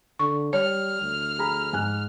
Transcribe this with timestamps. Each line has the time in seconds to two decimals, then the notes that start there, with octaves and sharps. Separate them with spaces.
0.19 D3 C#6
0.53 G3 C#5 F6
1.01 D2
1.39 G#4 A#5 B5
1.73 G#2 G#5 F#6